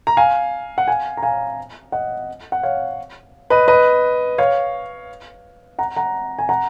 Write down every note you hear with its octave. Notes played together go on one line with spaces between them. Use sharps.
A#5
F5 G#5
F#5
F5 G#5
A#5
F5 G#5
D#5 F#5
F#5
C#5 F5
B4 D#5
B4 D#5
C#5 F5
F#5 A#5
F#5 A#5
G#5
F#5 A#5